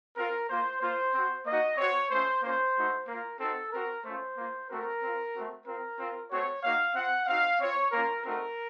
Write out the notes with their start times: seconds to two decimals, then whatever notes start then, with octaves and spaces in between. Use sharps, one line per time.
0.17 C4 F4 A#4
0.49 A#3 F4 C5
0.81 A#3 F4 C5
1.14 C4 F#4
1.46 A#3 D#4 F#4 D#5
1.78 C4 F#4 C#5
2.10 A3 C#4 F4 C5
2.43 A#3 C#4 F4 C5
2.75 A3 D#4 F#4
3.07 A#3 F4 A#4
3.40 C4 D#4 F#4 A4
3.72 C4 F#4 A#4
4.04 A3 C#4 F4 C5
4.37 A#3 F4
4.69 A3 C4 F#4 A#4
5.02 C4 F4
5.34 A3 C4 F#4
5.66 C4 F4 A#4
5.98 C4 F4
6.30 A3 C4 F#4 C#5
6.63 A#3 D#4 F#4 F5
6.95 C4 F4 F#5
7.27 C4 D#4 F#4 F5
7.60 C4 F4 C#5
7.91 A#3 C#4 F4 A#4
8.24 A3 C4 D#4 F#4 A#4